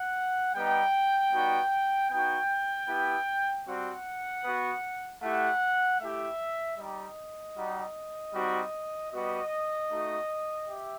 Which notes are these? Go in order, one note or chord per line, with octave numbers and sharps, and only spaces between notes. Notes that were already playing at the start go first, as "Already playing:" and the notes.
Already playing: F#5
G3 B3 D#4 G5
G3 B3 D#4 F#4
B3 D#4 F#4 G5
B3 E4 G4
G3 C4 F#4 F#5
B3 F#4
A3 E4 G4 F#5
A3 E4 G4 E5
G3 D#4 G4 D#5
G3 D#4 F#4
G3 C4 D#4 F#4
G3 B3 F#4 D#5
A3 D#4 F#4
G4 E5